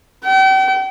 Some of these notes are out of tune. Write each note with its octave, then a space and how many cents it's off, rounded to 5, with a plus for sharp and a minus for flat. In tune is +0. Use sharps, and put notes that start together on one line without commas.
G5 -40